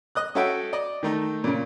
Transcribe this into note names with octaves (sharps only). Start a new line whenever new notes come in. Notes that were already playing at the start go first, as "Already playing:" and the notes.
D#5 D#6 F#6
C#4 F#4 A4 E5 F#5 G5
D5 D#5
D#3 A3 D#4
A#2 C#3